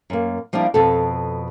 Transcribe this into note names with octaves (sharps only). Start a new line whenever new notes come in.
F#2 A#3
F3 G3 A#3 D4 E4
F2 B2 A4